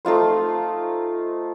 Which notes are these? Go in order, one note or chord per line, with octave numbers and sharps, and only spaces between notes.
A3 D#4 F4 C5